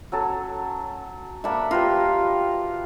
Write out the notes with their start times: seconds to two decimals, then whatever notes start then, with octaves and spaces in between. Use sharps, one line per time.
0.12 F#3 C#4 A4
1.44 A#3 D4 E5 F#5 B5
1.71 F4 G4 A#4 B4